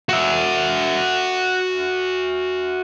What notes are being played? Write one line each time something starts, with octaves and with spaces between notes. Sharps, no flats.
F#4 E5